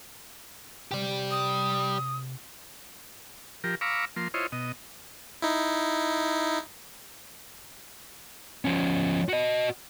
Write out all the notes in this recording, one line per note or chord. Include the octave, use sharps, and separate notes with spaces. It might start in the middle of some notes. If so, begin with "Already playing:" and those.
C3 G4 D5
D#6
F3 G4 A#4
F5 A#5 B5 C#6 D6 E6
F3 A#3 C6
E4 F4 C5 C#5 D#5
B2 D#5
D#4 E4
F3 C#4
F#4 D#5